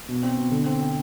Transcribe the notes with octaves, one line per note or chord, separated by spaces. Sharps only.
B2
C4
B2
D3
C4
C4